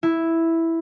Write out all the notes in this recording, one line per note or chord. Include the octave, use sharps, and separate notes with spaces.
E4